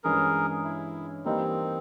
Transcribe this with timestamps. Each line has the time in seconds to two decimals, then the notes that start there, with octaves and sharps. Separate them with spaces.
0.04 G2 E3 G#3 C#4 G#4 A#4
0.64 E4
1.25 E3 G3 A#3 C4 D#4